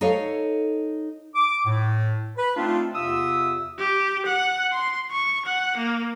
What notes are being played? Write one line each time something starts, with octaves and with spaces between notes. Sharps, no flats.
D#4 A4 C#5 F5
D6
A2
B4
A3 C4 D4 D#4 F4
E2 C3 F4 E5 D#6 E6
G4
F#5
C6
C#6
F#5
A#3